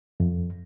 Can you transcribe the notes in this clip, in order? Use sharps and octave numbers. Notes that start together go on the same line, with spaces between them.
F2